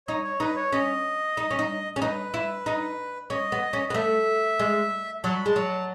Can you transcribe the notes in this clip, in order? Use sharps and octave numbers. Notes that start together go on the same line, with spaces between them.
D#4 C#5
C#5
D#4 B4
C#5
C#4 D#5
D#4
C#4
D#4
C#4
D#4 B4
E4
D#4
C#4 D#5
B3
C#4
B3 D#5
A3 E5
G#3
F#3 A5
B5
G#3 A5
F#3